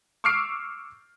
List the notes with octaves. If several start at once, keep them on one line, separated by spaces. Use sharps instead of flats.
C#6 D6 E6 F6 C7 D7